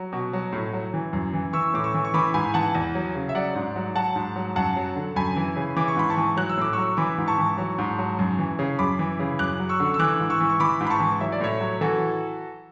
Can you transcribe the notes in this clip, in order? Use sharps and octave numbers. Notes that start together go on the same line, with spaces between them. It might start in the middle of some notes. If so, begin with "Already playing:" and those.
Already playing: F#3
B2
F#3
A2
F#3
E3
F#2
E3
E3 C#6 E6
A2 D6
C#6 E6
E3
C#6
E3 B5 D6
G#2 G#5 B5
E3 F#5 A5
E2
F#3
C#3
E5
F#3 D5 F#5
G#2
F#3
F#3 F#5 A5
G#2
F#3
F#2 F#5 A5
F#3
D3
F#2 G#5 B5
E3
C#3
E3 D6
C#6
G#2 B5
A5 C#6
E3
F#3 F#6
E6
A2 D6
F#3 C#6 E6
E3 B5 D6
G#2
A5 C#6
E3
F#3
G#2
F#3
F#2
E3
C#3
F#2 B5 D6
E3
C#3
F#2 D6 F#6
F#3
C#6 E6
D3
E6
E3 D6 F#6
G#2
C#6 E6
E3
C#6
E3 B5 D6
G#2
B5
A5 C#6
E3
F#3 E5
D5
A2 C#5 E5
F#3
E3 F#4 A4